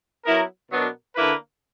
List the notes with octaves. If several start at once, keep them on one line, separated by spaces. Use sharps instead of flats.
F#3 B3 E4 A#4
B2 F#3 B3 D4 A#4
D3 A#3 E4 B4